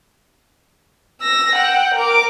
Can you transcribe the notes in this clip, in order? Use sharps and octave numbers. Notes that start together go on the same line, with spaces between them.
E6 A#6
F#5 G5
A#4 D6